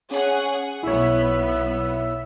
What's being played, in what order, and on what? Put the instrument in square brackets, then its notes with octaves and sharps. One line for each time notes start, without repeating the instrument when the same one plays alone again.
[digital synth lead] C#4 [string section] G#4 F#5
[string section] B1 B3 [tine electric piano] E4 C#5 [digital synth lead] E5